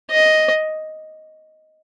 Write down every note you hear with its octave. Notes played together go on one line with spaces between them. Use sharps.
D#5